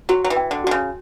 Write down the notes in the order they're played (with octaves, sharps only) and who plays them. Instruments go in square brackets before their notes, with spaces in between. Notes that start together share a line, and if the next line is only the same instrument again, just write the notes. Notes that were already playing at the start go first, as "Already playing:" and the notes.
[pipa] F#3 [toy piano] F#4
[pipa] F#3
E3
[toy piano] G5
[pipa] D3
[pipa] D3 [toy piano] F#4
[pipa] C#3